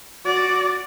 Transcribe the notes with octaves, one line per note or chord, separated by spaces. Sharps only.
F#4 D5